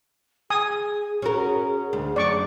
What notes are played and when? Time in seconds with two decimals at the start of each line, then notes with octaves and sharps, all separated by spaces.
0.50 G#4 G#5 D#6
1.22 C#4 F#4 A#4
1.93 D2
2.16 F#2 D5 C#6 D6